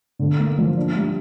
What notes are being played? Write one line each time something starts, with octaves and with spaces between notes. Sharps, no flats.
D3
A#3
F3
D4
G3